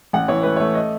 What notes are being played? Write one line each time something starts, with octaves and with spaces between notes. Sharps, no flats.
A1 F#5
E3 C#5
A3 B4
A3 C#5
D#5